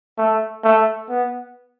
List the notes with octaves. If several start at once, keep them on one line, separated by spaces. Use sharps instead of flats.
A3
A3
B3